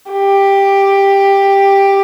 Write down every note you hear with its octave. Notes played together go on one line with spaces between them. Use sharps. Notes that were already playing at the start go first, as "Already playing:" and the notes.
G4